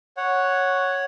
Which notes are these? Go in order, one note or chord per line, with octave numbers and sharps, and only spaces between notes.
C#5 F#5